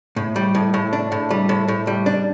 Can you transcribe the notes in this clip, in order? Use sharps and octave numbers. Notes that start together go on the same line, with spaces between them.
A2
G3
A2
A2
D4
A2
G3
A2
A2
G3
D4